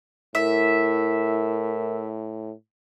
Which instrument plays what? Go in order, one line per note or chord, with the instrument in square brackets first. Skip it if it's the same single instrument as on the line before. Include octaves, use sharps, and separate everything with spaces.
[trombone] A2 [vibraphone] E4 A#4 [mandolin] E5